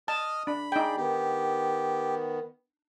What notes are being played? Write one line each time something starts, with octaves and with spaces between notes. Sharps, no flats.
D#5 A5 D#6 F6
D4 B5
D#4 G#4 D5 G5
D#3 B3 G4